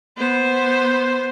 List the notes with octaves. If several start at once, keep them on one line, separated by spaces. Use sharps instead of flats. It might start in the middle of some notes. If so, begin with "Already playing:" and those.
B3 C5